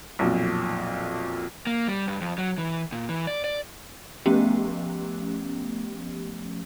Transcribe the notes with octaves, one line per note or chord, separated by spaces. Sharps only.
B1 F2 A#2
A#3
G3
G2
F2
F#3
E3
A#2
E3
D5
D5
F3 A3 B3 C#4 G4